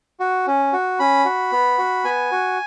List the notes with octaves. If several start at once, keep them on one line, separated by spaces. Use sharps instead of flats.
F#4
C#4
F#4
C#4 B5
F#4
B3
F#4
B3 G#5
F#4